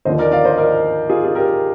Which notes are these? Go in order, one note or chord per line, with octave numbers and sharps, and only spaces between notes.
D#2 D3 F3 C5 D#5
A#4 D5
D5 F5
C5 D#5
A#4 D5
F4 G#4
G#4
G4 A#4